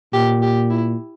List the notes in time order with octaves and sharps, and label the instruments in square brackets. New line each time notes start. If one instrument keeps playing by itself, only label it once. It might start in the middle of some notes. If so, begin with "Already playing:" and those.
[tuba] A#2 [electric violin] G4
[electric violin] G4
E4